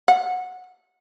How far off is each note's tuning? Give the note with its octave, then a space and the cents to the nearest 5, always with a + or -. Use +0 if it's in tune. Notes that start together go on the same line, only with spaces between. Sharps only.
F#5 -15